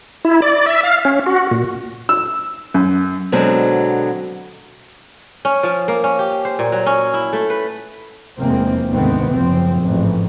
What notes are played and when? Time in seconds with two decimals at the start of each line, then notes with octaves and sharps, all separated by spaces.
0.25 E4
0.42 D5
0.66 E5
0.83 F5
1.05 C#4
1.26 F#4
1.51 A#2
2.09 E6
2.74 F#2
3.32 B2 D3 F#3 G#3 C4
5.45 C#4
5.63 F3
5.88 A#3
6.04 C#4
6.19 G4
6.45 C5
6.59 A#2
6.72 F#3
6.86 C#4
7.14 E4
7.33 A3
7.50 B4
8.38 F1 E2 G#3 A#3 C4
8.90 D2 G#2 C3 D#3 B3 C4
9.29 F#1 C#2 F3 C4
9.80 A1 F2 G#2